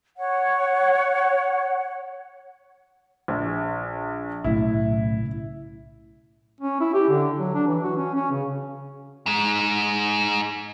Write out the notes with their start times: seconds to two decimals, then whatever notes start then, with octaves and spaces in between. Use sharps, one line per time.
0.17 C#5 F#5
3.28 A#1
4.44 B1 A2 C#3 E4
6.61 C#4
6.81 E4
6.94 G4
7.09 D3
7.39 F#3
7.54 D4
7.67 E3
7.83 F#4
7.97 C#4
8.14 C#4
8.31 C#3
9.26 G#2 G#3